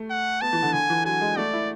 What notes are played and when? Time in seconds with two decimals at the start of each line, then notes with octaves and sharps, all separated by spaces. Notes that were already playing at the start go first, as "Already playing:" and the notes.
Already playing: A3
0.10 F#5
0.41 B3 A5
0.53 E3
0.63 D3
0.73 D3 G#5
0.90 E3
1.05 F#3 G#5
1.21 G#3
1.37 A3 D5
1.53 E4